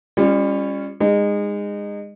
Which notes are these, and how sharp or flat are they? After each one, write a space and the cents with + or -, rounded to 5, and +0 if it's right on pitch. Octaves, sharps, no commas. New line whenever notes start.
G3 +35 C#4 +0 F4 -10
G#3 -25 D#4 -25